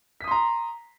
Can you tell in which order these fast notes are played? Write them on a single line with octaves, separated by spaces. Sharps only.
B6 D#6 C6 A#5